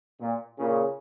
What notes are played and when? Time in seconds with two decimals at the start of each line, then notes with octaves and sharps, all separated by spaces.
0.21 A#2
0.59 A#2 C#3